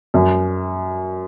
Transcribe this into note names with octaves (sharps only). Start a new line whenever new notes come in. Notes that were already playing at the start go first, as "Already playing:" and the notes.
F#2